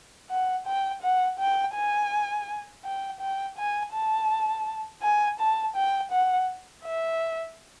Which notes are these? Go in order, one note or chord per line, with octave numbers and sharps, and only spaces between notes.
F#5
G5
F#5
G5
G#5
G5
G5
G#5
A5
G#5
A5
G5
F#5
E5